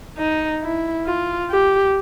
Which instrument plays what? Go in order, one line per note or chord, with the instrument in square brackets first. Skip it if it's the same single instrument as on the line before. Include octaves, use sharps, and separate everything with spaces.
[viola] D#4
E4
F4
G4